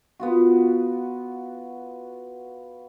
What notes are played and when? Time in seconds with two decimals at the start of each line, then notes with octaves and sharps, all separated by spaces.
0.20 B3 F4 F#4